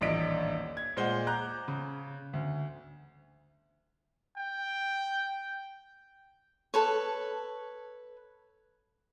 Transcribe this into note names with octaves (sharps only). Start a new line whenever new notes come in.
D#1 A1 D4 D#5 B6 D7
G#6
A#2 G#3 C5 F#5 G7
A#5 D6 F#6 G6
C#3
D2
G5
A4 B4 C#5